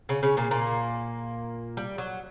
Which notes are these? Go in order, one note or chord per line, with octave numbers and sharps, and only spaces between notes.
C#3 C#4
C#3 C#4
A#2 A#3
A#2 A#3
G3
F#3